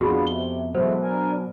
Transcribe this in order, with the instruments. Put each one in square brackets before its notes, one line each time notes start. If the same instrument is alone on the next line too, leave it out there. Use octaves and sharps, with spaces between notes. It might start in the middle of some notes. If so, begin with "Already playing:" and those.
[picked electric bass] F2 B2 [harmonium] B3 D4 F4 [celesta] F#4 G#4 B5
[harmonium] C3 [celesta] G7
[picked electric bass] B2 F#3 [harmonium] E3 G#3 A3 [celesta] C5
[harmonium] D4 A#4 G#5